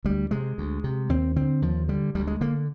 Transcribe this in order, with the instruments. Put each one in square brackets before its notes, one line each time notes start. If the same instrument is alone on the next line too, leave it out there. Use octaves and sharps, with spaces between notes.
[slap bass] D2 G3
C3 G#3
D2
C3
D#2 C4
D3 C4
D#2 F3
D3 G3
D2 G3
G#3
D3 A#3